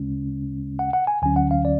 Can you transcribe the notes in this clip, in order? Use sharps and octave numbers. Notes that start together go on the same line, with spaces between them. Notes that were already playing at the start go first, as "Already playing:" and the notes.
Already playing: D2 C#3 G#3 C#4
F#5
F#5
G#5
D2 D3 F#3 C#4 G#5
F#5
F5
D5